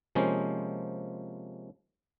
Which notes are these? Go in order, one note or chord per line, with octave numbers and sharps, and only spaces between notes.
C3 F3 G#3 A#3 C#4 C5